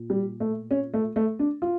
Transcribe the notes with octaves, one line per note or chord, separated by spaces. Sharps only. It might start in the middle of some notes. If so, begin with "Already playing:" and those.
Already playing: A#2
G3
A3
C#4
A3
A3
D4
F4